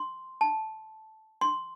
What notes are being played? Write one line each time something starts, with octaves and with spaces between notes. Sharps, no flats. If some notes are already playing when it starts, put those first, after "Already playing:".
Already playing: C6
A5
C6